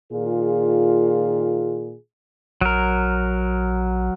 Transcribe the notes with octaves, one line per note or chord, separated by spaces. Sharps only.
A#2 D#3 F4 G#4
A#1 F#3 A#4